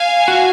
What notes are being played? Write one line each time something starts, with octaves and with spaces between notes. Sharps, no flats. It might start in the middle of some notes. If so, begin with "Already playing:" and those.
Already playing: F5 G#5
F#4